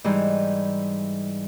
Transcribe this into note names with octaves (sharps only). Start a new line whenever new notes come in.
G#2 E3 G3